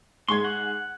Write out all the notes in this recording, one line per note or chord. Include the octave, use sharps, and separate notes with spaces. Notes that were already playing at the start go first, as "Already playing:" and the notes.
G#2 G#3 C6 C#6 G#6
F#5